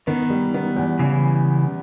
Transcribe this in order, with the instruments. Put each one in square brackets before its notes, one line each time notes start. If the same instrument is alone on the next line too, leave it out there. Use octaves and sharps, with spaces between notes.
[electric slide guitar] D#3 [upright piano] B3
[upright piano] G3
B3
E2
[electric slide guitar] C#3 E3